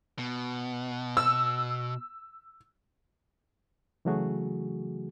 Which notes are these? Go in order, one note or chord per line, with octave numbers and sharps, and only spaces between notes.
B2
E6
C#3 E3 F#3 A3 F#4 G#4